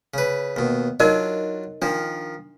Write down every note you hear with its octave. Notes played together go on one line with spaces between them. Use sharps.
C#3 B4
D#2 B2
F#3 D4 D#4 F4 A#4 D#5
D#3 F3 D4